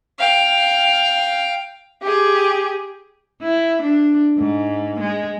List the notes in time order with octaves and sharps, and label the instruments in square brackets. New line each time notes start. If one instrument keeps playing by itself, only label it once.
[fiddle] F5 G5
[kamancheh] G4 G#4
[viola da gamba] E4
D4
G#2
G#3